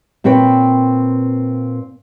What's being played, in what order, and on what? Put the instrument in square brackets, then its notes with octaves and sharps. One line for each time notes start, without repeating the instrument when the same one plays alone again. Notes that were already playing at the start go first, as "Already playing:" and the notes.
[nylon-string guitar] A#2 C4 B4 C#5 G5